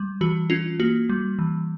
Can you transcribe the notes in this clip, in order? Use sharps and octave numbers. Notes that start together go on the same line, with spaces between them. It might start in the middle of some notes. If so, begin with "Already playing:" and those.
Already playing: G3
E3 F#4
C#4 F4
A#3 F#4
G3
E3